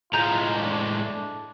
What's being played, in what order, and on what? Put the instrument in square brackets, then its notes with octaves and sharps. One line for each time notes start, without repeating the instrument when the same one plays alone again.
[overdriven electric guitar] A2 G#3 [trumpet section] F4 [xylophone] A#5 G6
[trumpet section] D4